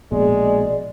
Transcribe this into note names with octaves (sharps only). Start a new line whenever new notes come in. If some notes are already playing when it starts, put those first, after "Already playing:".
A#1 B2 G#3 D5